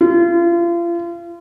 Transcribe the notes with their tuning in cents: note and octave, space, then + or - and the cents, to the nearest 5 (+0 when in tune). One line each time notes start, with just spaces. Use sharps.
F4 -35